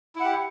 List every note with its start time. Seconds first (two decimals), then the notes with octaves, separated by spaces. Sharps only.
0.16 E4
0.20 F#5
0.24 G4